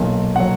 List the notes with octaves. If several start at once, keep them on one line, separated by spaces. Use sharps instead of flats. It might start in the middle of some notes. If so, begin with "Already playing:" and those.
Already playing: B1 A#2 F#3
A#2 F#3 F#5